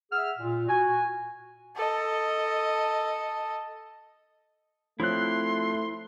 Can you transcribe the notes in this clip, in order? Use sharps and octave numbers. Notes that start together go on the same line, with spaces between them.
G#4 E5 F#5 E6 F6
A#2
F#4 G#5
A4 D#5
F3 A3 C4 E4 C#5 C6 F#6